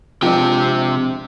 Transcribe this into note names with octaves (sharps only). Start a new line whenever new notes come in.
C3 F3 G#3 D4 G5